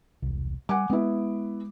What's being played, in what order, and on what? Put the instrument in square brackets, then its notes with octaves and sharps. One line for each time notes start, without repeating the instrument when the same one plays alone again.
[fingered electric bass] E1 C2
[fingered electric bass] G3 [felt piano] F#5 G#5 D6
[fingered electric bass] G#3 [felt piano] B3 E4